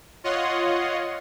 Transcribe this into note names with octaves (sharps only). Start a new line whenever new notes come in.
F4 C#5 D#5 F#5 C6